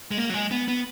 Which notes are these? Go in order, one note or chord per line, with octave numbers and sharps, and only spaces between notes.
G#3
A#3
F#3
G#3
B3
B3